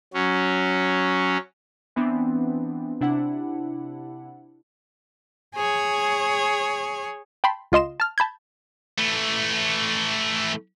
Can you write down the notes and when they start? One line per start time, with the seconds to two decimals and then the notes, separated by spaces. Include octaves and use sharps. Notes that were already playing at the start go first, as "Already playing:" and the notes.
0.14 F#3 C#4
1.96 E3 B3 C4 D4
3.01 C3 D4 E4 F#5
5.56 G#4 C#5
7.44 G5 A5 B5 C6
7.72 C#2 F4 D#5 C6 E7
8.00 A5 F6
8.18 A5 B5 G6 G#6
8.98 E3 A3